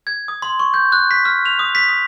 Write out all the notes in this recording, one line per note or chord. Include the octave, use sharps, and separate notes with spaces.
G#6
D#6
C6
C#6
G6
F#6
B6
F6
F7
D#6
B6
D#6